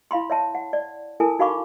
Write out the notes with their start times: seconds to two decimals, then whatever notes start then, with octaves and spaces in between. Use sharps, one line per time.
0.11 E4 F5 B5 C6
0.30 C#5 E5 A5
0.55 F#5
0.73 D5
1.20 E4 A4 A#4 G#5 A5
1.39 D#4 F#4 F5 B5 C#6 D6